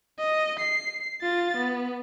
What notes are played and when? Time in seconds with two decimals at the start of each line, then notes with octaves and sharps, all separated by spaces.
0.19 D#5
0.60 C7
1.22 F4 A6
1.58 B3